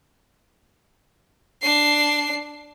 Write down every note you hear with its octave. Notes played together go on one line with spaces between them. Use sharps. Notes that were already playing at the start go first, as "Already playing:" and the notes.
D4 C7